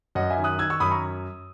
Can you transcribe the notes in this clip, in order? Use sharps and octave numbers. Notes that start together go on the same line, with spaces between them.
F#2 D#5 F#5
E5 G#5
D#3
D#6 F#6
D#3 E6 G#6
C#6 E6
F#2 B5 D#6
A#5 C#6